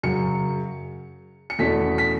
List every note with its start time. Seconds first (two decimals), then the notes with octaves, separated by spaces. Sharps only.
0.03 F#2 C#3 F#3 C#7
1.50 C#7
1.59 E2 B2 A3 C#4 B6
1.98 B6